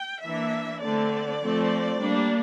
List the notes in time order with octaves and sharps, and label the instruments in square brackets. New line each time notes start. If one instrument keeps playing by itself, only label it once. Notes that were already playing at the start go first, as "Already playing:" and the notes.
Already playing: [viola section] G5
E3 A#3 D4 E5
D3 A3 C4 D5
F3 A3 C4
G3 A#3 D4